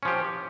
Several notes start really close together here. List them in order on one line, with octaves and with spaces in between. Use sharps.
C#4 F3 G4